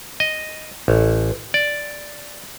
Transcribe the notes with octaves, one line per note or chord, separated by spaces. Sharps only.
D#5
A1
D5